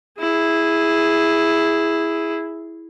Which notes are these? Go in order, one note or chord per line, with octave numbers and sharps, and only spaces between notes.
E4 G#4